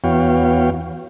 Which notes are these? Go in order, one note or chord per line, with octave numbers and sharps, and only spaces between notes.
E2 B3 F#4 C#5 F5 G5